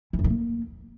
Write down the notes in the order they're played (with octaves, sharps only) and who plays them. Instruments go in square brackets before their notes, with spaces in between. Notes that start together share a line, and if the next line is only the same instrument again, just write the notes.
[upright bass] E3
F#2
G2
A#3